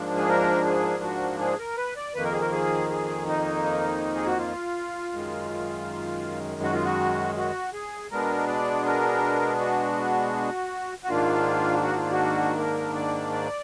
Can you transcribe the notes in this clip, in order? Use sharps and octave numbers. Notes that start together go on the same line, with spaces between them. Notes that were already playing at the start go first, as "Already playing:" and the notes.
Already playing: G#2 F3 A#3 D4
G#4
A#4
G#4
F#4
G#4
A#4
B4
D5
F2 D#3 A#3 B4
A#4
G#4
A#4
G#4
G#4
D#4
G#4
F#4
F4
F#2 D#3 G#3
F#4
F4
F#4
F#4
G#4
B2 G#3 B3 D4 A#4
D5
A#4
F#4
F#4
G#2 D#3 A#3 D4 F4
F#4
F4
F#4
A#4
D5
D5